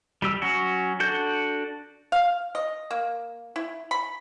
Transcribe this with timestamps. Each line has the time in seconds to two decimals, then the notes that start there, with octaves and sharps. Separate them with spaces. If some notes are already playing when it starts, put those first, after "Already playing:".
0.22 G3 G4 E6
0.42 F#3 C#4 F#4
1.00 D4 F#4 A4 G6
2.12 F5
2.55 D#5
2.91 A#3
3.56 E4
3.91 B5